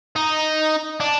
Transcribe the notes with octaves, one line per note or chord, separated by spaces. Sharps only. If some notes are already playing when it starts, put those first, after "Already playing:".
D#4
D4